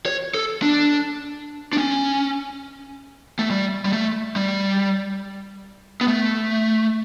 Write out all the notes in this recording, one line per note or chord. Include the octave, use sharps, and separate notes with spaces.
C#5
A4
D4
D4
C#4
A3
G3
G3
A3
G3
B3
A3